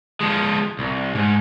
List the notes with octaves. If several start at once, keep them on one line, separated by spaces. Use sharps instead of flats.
F3 G#3
C2
G#2